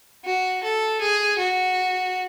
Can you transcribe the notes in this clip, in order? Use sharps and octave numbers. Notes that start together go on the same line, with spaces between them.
F#4
A4
G#4
F#4